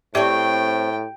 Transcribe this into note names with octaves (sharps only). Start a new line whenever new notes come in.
A2 C4 G4 A4 C#5 D5 E5 G5